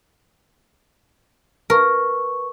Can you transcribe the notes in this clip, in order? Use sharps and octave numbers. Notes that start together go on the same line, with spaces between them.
A#4 B4 C#6